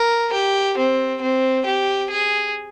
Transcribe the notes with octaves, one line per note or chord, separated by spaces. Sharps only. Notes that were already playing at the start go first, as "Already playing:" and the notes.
Already playing: A#4
G4
C4
C4
G4
G#4